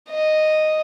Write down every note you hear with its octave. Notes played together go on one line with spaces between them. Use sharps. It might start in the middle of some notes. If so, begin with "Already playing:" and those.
D#5